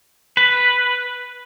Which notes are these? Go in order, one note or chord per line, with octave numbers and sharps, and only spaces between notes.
B4